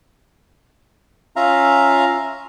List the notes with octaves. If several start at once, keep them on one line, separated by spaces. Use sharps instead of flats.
C#4 F4 E5 F5 A#5